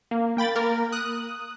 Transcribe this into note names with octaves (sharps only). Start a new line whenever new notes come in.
A#3
A#3 G5 B5 A6
A#3 A#4
D#6 F#6